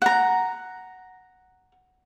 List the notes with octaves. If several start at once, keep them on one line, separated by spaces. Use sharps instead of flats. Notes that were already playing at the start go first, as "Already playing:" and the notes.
F#5 A#5